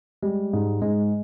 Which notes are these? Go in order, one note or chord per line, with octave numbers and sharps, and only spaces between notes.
G3 G#3
G#2
G#2 G#3